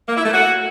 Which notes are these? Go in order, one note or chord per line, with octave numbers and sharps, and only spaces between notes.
A#3
E4
A3
F#4